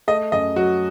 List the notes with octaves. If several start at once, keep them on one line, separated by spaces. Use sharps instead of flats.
A3 D#5
F#2 D#5
F#3 F#4